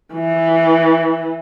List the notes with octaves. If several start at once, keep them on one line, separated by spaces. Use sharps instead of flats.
E3